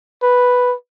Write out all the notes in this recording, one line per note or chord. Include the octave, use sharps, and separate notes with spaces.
B4